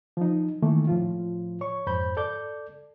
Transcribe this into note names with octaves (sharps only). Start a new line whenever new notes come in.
F3 D#4
D#3 E3 A3 A#3
A2 F3 F4
C#5 C#6
F2 G#2 C5 B5 G6
A4 D5 D6 G6